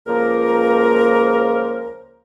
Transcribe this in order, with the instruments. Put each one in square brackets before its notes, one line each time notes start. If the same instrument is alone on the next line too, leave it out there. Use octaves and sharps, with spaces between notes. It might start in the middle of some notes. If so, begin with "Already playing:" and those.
[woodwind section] C#2 F3 A#3 A#4